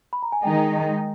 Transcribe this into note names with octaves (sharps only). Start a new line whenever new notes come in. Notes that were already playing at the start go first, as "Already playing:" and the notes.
B5
A#5
G#5
D#3 G#3 D#4 G5